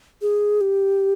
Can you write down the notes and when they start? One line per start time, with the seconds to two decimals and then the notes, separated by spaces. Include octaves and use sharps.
0.22 G#4
0.61 G4